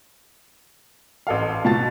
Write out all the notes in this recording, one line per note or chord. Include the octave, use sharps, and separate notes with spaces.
A1 A4 F5
B2 F5 A5 A6